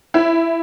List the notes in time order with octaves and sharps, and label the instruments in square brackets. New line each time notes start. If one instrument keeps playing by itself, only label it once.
[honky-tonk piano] E4